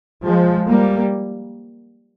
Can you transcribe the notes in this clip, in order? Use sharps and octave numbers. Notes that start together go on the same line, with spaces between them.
F3 G#3
G3 A#3